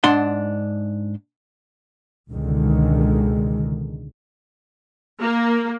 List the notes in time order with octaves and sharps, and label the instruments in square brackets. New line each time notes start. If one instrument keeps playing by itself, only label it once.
[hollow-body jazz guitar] G#2 D4 F#5 A5 C6
[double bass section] C#2 B2 D3 D#3 G#3
[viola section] A#3